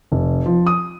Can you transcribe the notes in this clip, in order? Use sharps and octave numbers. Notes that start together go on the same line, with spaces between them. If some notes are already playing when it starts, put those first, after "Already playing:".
F1
F3
D#6